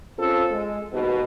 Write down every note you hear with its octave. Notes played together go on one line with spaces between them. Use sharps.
C4 C#4 F4 A4
G#3
D#2 G#2 B2